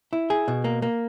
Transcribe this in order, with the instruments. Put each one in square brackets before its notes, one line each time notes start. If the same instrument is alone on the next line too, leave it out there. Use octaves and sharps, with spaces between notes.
[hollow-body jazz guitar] E4
G#4
B2
A#3
A#3